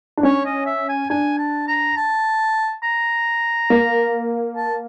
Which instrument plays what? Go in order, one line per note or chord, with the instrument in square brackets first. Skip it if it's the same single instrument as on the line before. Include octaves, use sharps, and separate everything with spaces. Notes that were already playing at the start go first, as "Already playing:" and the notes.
[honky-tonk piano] D4
[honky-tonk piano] C#4 [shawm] C#5
[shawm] D#5
E5
G#5
[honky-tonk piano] D4 [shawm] G#5
[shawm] A5
A#5
A5
A#5
[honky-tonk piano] A#3
[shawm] A5